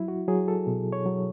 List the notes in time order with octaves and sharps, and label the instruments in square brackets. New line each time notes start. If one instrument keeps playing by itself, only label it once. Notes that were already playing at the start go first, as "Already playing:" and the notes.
Already playing: [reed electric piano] F#3 E4
F#4
F#3 G#4
A4
B2
C#5
F#3